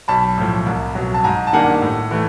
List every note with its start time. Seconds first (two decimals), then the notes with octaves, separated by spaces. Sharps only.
0.08 B1 A5 B5
0.38 A2 F3
0.66 C2
0.95 B2 F#3
1.14 A5
1.24 G#2 G#5 A#5
1.47 A5
1.53 D#3 G3 A#3 D4 F#5 G#5
1.82 A2
2.11 E3 A3